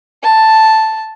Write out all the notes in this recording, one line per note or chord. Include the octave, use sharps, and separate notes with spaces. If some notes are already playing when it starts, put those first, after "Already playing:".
A5